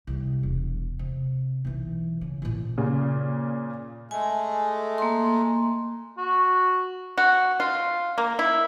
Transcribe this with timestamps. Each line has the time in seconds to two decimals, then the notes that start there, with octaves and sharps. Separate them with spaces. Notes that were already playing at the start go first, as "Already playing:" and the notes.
0.07 C2
0.43 E1
0.99 C3
1.65 B1 E3
2.21 C#3
2.42 A1 A#2
2.78 A#2 C#3
4.11 G#3 A3 G#5
4.98 A#3 C6
6.18 F#4
7.17 F#4
7.60 F4
8.18 A#3
8.39 E4